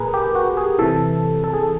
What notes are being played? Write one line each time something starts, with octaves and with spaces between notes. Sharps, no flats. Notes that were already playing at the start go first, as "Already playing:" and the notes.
Already playing: A#2 G#4 A#4 B4
G4
F#4
G#4
C3 E3 A4
A4
G#4
A4